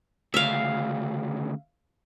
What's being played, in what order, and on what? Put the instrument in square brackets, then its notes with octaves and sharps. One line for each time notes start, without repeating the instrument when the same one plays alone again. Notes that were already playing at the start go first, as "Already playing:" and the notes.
[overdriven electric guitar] D2 C#3 [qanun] E5 F5